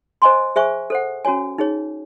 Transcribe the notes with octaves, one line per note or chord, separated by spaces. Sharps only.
C5 D#5 G#5 C6
G#4 C5 E5 G#5 C#6
A4 C5 F#5
C#4 F#4 C#5 G#5
D#4 G#4 C#5